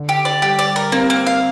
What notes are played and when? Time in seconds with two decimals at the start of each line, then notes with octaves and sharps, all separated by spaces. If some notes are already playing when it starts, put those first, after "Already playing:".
Already playing: D3
0.09 G4
0.25 D5
0.42 G3 G4
0.59 D5
0.76 A#4
0.92 A#3 C4
1.10 A#3
1.27 F5